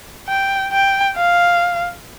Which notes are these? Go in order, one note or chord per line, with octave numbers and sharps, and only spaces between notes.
G5
G5
F5